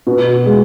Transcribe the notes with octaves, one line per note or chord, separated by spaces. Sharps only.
B2
G#3